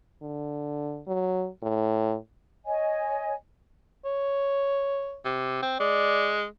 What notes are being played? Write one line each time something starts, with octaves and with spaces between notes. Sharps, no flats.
D3
F#3
A2
C#5 D#5 G#5
C#5
C3
C4
G#3 D5